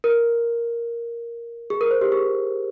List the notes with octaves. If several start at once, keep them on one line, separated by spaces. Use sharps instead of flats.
A#4
G#4
A#4
C5
G4
G#4